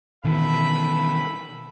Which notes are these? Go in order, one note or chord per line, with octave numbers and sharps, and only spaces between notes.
B2 D#3 E3 A4 E5 B5